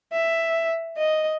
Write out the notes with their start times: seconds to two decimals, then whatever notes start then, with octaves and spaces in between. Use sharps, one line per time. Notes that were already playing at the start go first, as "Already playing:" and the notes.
0.12 E5
0.97 D#5